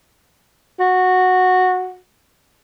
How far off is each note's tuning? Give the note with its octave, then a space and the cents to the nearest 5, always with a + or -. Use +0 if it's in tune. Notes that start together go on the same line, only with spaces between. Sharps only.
F#4 -10